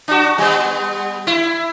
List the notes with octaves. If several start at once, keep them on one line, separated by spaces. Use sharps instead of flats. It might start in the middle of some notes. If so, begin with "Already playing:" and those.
D4 F#4
G3 B3
E4